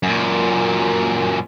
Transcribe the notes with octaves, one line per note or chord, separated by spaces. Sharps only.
F#2 A#2